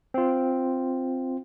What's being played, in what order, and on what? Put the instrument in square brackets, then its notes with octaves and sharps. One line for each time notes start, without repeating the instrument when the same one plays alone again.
[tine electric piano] C4 F4